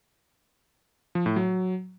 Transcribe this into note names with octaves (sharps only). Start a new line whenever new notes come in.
F3
A2
F#3